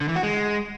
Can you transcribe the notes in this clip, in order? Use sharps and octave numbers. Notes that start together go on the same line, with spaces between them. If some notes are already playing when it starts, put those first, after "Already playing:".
D3
E3
F#4
G#3